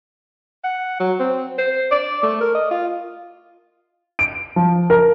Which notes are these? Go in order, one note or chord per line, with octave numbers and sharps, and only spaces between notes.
F#5
F#3
C4
C5
D5
A3
A#4
D#5
F4
D7
F3
A#4